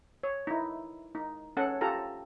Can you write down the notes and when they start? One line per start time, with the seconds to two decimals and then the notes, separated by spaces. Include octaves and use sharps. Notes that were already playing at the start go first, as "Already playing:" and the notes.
0.23 C#5
0.47 D#4 E4
1.15 D#4
1.57 C#4 A4 F#5
1.81 F4 G4 A4 A#5